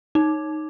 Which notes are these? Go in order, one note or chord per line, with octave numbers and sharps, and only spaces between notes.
D#4